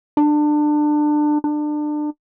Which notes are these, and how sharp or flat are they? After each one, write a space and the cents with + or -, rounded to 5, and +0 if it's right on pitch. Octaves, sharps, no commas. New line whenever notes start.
D4 +25
D4 +30